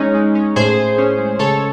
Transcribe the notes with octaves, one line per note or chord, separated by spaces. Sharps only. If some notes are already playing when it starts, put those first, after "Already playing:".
Already playing: G#3 C#4 D#4
G#3
C#4
A2 G#4 C5
A2
C#4
G#3
C#3 A4 C#5